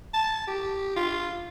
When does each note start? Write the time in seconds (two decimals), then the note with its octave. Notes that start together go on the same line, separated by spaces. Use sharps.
0.13 A5
0.47 G4
0.96 F4